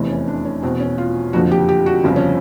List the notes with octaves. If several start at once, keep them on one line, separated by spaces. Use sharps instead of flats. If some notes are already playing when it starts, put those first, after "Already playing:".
Already playing: F1 E2 C3 E3
C#4
D4
C#4
E2 B2 C4
C#4
F4
F#1 F2 D3 F3 F#4
G4
G4
F#4
G1 F2 C#3 F3
C#4